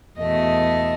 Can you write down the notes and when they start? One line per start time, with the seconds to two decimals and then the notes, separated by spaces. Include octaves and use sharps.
0.19 E2 B2 A3 D#5